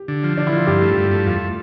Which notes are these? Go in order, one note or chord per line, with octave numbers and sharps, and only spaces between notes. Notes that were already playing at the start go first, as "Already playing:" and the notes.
Already playing: G4
D3
F3
D3 D4
E4
F3 F4
G2 G4
A3
G2
A3
F2 F4